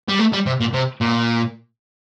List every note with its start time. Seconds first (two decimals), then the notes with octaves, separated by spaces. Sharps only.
0.09 G3
0.20 A3
0.33 G3
0.46 C3
0.60 A#2
0.74 C3
1.01 A#2